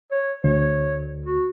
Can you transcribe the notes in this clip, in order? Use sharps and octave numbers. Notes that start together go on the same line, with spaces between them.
C#5
D2 C#5
F#4